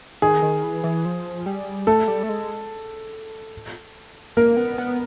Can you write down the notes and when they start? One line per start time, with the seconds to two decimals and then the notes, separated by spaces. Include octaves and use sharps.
0.22 D#3 G#4
0.42 D#3
0.64 E3
0.84 E3
1.05 F3
1.46 G3
1.87 A3 A4
2.08 G3
2.23 A3
2.29 G#3
4.37 A#3 A#4
4.57 B3
4.78 B3